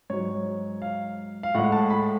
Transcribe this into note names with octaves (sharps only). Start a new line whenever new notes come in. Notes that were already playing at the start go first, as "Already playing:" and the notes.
G#2 F#3 C#5
F5
F5
A2 G#3 F#5
A5
B5